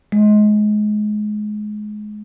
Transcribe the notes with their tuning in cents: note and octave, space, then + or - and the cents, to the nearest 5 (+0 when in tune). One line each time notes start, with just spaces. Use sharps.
G#3 +25